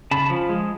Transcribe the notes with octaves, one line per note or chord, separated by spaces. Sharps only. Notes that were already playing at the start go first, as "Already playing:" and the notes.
C#3 A5 B5
F3
G#3